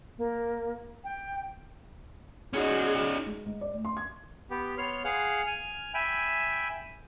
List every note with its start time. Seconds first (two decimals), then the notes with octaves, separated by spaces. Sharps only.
0.18 A#3
1.04 G5
2.53 C#4 D#4 F#4 G#4
3.26 G#3
3.45 G#2
3.61 D5
3.73 D2
3.85 C6
3.97 G#6
4.50 B3 G4
4.78 B3 C#5 C6 F6
5.04 G#4 F5 F#5
5.47 G#5 F6
5.94 E5 G5 G#5 B5